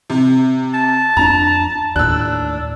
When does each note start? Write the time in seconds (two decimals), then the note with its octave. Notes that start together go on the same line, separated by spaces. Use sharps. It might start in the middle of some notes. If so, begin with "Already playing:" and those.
0.10 C3
0.74 A5
1.17 F2 C4 D4 A#5
1.96 D#2 A2 D4 E6 F#6